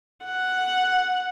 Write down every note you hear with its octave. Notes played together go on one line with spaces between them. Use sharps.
F#5